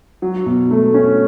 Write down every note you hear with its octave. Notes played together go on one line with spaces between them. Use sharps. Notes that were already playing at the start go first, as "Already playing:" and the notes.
F#3
B2
A3
C#4